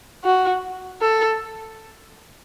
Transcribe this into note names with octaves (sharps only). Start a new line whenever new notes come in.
F#4
A4